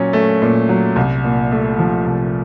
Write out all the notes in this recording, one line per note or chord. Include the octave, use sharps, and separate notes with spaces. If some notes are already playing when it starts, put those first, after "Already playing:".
Already playing: A#2 F#3 C#4
A3
A#2
F#3
C2
A#2
A3
F3
C2